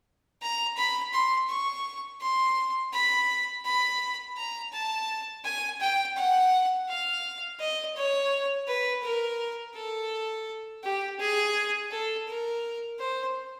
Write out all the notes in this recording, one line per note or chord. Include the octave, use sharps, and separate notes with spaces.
A#5
B5
C6
C#6
C6
B5
B5
A#5
A5
G#5
G5
F#5
F5
D#5
C#5
B4
A#4
A4
G4
G#4
A4
A#4
C5